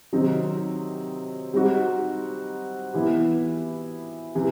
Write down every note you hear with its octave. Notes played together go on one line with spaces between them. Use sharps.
C3 D#3 F#3 C4 D#4
G3 C4 D#4 F#4
E3 B3 E4 G4
C3 E3